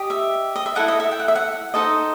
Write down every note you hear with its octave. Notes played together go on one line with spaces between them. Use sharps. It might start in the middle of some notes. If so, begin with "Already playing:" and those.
Already playing: G4 D#5
E5
D#5
E5
E4 A4 D#5 F#5
D#5
E5
G5
F#5
E5
F#5
D#4 A4 C5 D#5